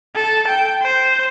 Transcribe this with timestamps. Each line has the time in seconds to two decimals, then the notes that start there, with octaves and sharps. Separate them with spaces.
0.16 A4
0.48 G5
0.82 C5